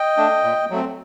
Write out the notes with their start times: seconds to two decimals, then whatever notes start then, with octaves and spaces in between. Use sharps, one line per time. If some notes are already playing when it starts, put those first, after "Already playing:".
Already playing: D#5 G5
0.17 A3 D4
0.44 A#2
0.70 F#3 A3 C4